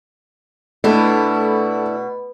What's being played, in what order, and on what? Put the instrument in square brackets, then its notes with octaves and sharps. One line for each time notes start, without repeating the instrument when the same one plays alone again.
[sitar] B2 [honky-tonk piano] A3 [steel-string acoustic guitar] D4 E4